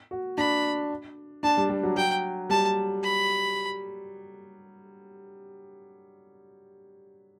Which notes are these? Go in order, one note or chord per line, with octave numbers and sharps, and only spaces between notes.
F#4
D4 B5
D4 A5
G3
G3
F#3
F#3 G5
G3 A5
B5